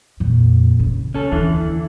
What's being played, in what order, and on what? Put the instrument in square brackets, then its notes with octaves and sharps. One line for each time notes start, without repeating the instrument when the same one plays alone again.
[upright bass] F2 A#2
C#3
[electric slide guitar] C#4 A4
[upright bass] D#2 [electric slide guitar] D3 E3